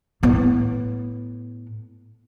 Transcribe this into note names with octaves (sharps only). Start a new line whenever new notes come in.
A2 B3